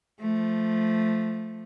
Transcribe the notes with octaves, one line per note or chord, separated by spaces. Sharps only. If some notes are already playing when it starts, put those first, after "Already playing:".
F3 A3